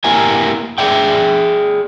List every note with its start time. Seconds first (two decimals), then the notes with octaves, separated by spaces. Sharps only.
0.04 A#3 E4 G4 A#4 E5 G#5
0.78 G#4 D5 E5 G5